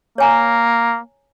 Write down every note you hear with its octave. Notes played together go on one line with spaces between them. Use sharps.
A#3 C#5 G#5 A#5